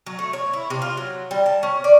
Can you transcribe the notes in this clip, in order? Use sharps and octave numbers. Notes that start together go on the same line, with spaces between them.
F#3
A3
C#5
E4
C3
F4
F#3
G3
A5
C#4
D5